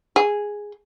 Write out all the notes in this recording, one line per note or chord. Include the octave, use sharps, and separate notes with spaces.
G#4